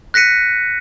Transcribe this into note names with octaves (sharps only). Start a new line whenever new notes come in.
F#6 A#6 B6 C#7 D#7